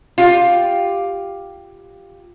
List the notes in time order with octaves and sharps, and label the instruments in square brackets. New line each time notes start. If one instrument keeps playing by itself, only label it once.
[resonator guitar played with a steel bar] F4 G4